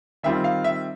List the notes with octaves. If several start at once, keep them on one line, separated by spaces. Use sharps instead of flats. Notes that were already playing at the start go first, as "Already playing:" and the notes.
D#3 G3 C4 F4 E5
F5
E5